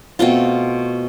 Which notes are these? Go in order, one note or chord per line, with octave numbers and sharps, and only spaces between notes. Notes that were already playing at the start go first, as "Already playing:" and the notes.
B2 A3 C4 F4